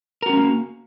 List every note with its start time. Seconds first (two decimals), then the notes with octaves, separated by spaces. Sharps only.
0.22 A#4
0.26 F#4
0.30 C#4
0.33 G#3
0.37 A#3